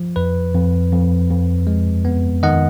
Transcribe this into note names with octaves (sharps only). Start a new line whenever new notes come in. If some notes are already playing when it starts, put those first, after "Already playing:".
Already playing: F3
F2 B4
F2
F2
F2
G#3
B3
D#3 D#5 F#5